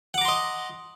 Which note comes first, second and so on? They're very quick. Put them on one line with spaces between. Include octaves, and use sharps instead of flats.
F#5 D6 A#5 C6 D#5